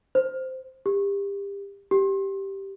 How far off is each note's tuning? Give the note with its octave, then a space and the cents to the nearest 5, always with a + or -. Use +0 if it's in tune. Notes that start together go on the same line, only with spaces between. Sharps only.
C5 -10
G4 +30
G4 -5